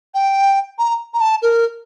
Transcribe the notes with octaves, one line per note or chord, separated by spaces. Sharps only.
G5
A#5
A#5
A5
A#4